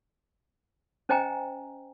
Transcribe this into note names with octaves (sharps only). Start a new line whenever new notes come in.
C#4 C5 D#5 G5 G#5 A#5